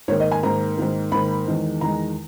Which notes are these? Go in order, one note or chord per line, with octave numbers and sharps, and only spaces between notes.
G#2 D#3 A#3 C#5
D#5
G#5
G#2 D#3 A#3 A#5
G#2 D#3 A#3
G#2 D#3 A#3 B5
E2 D#3 G#3
E2 D#3 G#3 A#5